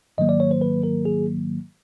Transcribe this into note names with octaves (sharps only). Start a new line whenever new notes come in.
G#2 D#3 F#3 A#3 D#5
D5
C#5
C5
B4
A#4
G#4